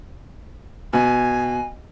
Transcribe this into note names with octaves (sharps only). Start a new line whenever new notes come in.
B2 G#5